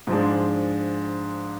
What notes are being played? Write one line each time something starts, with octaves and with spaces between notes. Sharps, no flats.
G#2 F3 G#3 D4